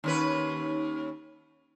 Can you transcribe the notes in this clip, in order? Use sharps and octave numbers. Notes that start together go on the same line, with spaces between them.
D#2 C#4 B4